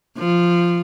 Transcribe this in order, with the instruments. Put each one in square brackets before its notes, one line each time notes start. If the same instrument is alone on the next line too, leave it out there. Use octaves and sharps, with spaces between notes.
[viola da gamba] F3